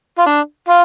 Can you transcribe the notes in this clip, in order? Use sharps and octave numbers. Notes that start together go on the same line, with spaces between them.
F4
D4
F4